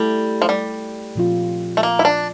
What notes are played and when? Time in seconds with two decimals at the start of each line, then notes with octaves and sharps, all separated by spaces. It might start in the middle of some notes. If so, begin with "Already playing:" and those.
Already playing: G3 A3 E4 A4
0.42 F3
0.49 G3
1.15 A#2 F3 C4 F4
1.77 A3
1.83 A#3
1.99 E4
2.05 D4